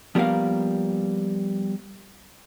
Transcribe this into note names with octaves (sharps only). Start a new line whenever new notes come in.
F3 G3 A#3 B3 A#4 F5